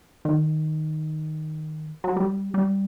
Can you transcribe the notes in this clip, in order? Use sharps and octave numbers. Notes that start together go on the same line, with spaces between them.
D#3
F#3
G3
G3